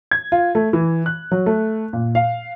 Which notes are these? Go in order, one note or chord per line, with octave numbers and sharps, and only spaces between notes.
G#6
F4
A3
E3
F#6
F#3
A3
A#2
F5